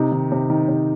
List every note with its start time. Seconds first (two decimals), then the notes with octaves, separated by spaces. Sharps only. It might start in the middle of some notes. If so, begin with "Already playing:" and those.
Already playing: C3 D#4
0.12 D#3
0.32 C3
0.50 D#3
0.69 C3